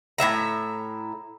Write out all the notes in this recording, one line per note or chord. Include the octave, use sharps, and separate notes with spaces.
A2 C#3 E5 A#5